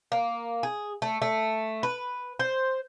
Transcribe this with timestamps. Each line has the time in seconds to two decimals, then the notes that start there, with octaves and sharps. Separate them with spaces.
0.12 A#3
0.63 G#4
1.02 A3
1.22 A3
1.83 B4
2.39 C5